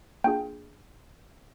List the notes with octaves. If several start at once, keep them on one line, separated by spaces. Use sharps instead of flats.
A#3 D4 F4 G#4 G5